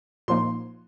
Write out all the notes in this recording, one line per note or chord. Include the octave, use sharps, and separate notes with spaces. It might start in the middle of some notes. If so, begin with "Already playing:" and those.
A#2 F3 A#3 D#4 C6